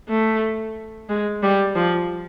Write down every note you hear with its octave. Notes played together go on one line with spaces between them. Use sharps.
A3
G#3
G3
F3